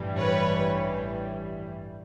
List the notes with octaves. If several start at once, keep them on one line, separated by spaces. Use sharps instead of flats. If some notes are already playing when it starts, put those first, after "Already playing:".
Already playing: A1 G2 E3 G3
B4 C#5